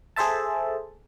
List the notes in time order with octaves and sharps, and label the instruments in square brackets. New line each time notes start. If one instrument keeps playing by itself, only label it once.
[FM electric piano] G#4 A4 C5 E5 A5